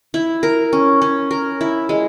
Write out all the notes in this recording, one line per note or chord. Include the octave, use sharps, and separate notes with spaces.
E4
A#4
C#4
C#4
A#4
E4
G#3